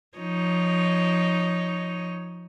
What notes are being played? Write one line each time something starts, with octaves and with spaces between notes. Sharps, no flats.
F3 D#4 C#5